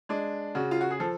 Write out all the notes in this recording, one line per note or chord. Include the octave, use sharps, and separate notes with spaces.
G#3 D4
C#3 F#4
F4
F#4
G#4
F3 A4